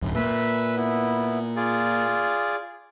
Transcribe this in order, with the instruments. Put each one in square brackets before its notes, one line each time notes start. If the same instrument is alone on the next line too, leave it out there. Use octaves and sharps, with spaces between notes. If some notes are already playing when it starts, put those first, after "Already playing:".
[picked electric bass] D1 F#2
[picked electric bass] A#2 A#3 [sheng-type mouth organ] B4 E5
[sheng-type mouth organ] B3 E4
F4 G#4 D5